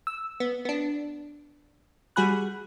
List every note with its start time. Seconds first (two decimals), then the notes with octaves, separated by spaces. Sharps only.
0.07 E6
0.40 B3
0.65 B3 D4
2.16 G3 F#4 G#4 B5 F#6